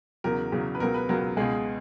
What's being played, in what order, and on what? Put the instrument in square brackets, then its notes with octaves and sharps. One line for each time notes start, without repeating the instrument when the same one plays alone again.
[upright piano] E2 C#3 F#3 A#4
E2 C#3 F#3
B4
C#2 B2 F#3 A#4
B4
C#2 B2 F#3 A#4
C#2 B2 G#3 G#4